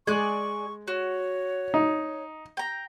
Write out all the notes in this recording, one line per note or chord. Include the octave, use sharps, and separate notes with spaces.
G#3 G#4 D5 C#6 F#6
F#4 C#5
D#4
G5 A#5